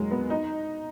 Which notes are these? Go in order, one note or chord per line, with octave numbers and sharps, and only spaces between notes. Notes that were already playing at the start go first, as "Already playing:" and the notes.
Already playing: F#3 G#3 A#3
B3
D#4